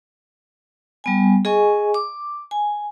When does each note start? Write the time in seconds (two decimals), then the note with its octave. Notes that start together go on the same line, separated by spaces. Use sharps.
1.04 G3 B3 G#5
1.45 G#4 D#5 G#5 C#6
1.94 D6
2.51 G#5